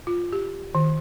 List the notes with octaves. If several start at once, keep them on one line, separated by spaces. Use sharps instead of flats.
F4
G4
D#3